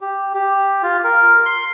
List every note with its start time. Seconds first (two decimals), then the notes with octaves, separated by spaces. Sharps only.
0.01 G4
0.34 G4
0.83 F4
1.04 A#4
1.46 C6